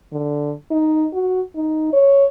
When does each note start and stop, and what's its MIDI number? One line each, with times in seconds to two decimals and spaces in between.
0.13 0.54 50
0.71 1.06 63
1.13 1.41 66
1.56 1.92 63
1.93 2.26 73